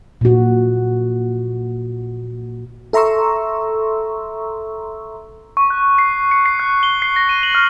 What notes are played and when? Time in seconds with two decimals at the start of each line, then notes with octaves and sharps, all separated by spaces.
0.21 A#2 F#4
2.93 A4 E5 A#5 C6 C#6 E6
5.57 C#6
5.70 F#6
5.98 C7
6.31 C#7
6.46 C7
6.59 F#6
6.83 G7
7.02 C7
7.16 A#6
7.29 D#7
7.43 F#7
7.55 F6